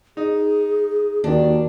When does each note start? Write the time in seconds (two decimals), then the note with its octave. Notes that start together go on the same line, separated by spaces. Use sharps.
0.17 D#4 G#4
1.24 D#2 D#3 D4 F#4